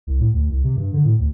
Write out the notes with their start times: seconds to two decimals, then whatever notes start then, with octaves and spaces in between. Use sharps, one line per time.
0.07 C2
0.20 A2
0.33 D2
0.50 C2
0.64 C3
0.76 G2
0.93 D3
1.05 A2
1.19 D2